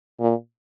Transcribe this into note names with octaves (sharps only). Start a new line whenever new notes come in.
A#2